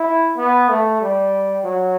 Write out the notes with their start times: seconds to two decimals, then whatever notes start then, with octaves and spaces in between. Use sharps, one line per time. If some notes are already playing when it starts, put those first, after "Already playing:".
Already playing: E4
0.37 B3
0.69 A3
1.02 G3
1.65 F#3